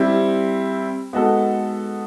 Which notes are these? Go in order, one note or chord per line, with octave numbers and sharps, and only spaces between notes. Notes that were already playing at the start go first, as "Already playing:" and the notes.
Already playing: G3 C4 E4
G#3 B3 D#4 F#4 A4